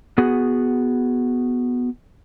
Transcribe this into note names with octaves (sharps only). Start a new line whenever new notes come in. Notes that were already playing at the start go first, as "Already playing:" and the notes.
B3 F#4 G#4